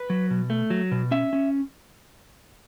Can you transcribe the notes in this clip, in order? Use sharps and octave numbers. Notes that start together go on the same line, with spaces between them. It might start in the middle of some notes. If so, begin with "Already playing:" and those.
Already playing: B4
F#3
B2
A3
F#3
B2
C#4 E5
C#4